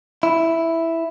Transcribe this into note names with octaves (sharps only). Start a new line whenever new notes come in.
E4